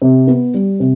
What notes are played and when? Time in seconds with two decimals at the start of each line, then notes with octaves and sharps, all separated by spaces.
0.02 C3
0.27 B3
0.54 G3
0.80 C3